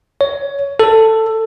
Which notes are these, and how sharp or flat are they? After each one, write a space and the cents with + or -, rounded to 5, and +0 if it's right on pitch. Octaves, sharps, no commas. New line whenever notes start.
C#5 +15
A4 +10